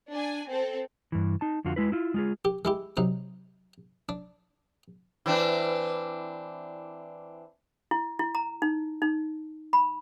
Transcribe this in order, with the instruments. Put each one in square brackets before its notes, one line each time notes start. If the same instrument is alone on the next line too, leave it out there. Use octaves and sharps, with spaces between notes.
[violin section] D4 G#5
C4 A4
[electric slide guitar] G2 E3
D#4 A5
F2 D3 F4 F#4
G#3 E4 B4
E4 F4
G#3 F4 G#4
[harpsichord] G4
G#3 E4 G4
C3 F#3 D#4
D4
[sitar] E3 C4 D4
[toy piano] E4
E4
A#5
D#4
D#4
B5